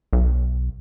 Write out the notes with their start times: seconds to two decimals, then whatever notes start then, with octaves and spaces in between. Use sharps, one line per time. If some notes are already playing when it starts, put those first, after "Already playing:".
0.13 B1